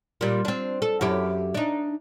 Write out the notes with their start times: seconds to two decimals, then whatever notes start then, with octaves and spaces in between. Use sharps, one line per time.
0.21 A#2 G3
0.45 C4 D4
0.82 A4
1.01 F#2 E4 G4
1.54 D4 D#4